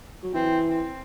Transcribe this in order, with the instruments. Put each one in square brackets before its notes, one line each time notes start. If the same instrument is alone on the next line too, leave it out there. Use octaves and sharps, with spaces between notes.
[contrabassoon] F#3
[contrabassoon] E3 [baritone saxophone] C4
[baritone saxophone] C4